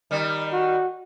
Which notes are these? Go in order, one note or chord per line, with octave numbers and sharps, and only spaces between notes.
D#3 G3
F#4